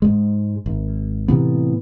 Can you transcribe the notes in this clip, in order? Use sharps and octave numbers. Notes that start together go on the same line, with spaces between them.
G#2 G#3
G#1
A2 C3 E3 B3